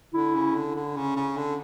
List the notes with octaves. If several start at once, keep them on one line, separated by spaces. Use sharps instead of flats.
D3 E4
C#3
D3
D3
C#3
C#3
D3